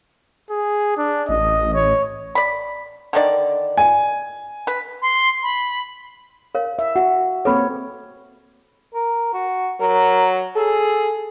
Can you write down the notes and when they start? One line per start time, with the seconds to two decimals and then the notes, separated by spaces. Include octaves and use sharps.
0.50 G#4
0.97 D4
1.29 A1 D#5
1.74 C#5
2.35 D5 B5
3.13 D3 D#3 D5
3.77 G#5
4.67 B4
5.02 C6
5.43 B5
6.55 A#4 C#5 F5
6.79 E5
6.96 F#4 F#5
7.45 A#3 C4 A4 B4 C#5 B5
8.94 A#4
9.33 F#4
9.80 F#3 A#4
10.56 G#4 A4